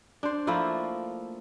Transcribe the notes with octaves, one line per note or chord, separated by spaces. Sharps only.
D4 C5
F3 A3 A#3 E4